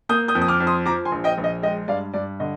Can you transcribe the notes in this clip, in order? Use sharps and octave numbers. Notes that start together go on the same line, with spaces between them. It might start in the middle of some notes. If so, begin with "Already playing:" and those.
A#3 D#6 G6
D#6 G6
F2
D#6
D6 F6
F2
C6 D#6
F3 A#5 D6
G#5 C6
A#1
D#5 G5
A#1
D#5
G#3 D#5 G5
G2 D5 F5
G2 D5
D3 D#5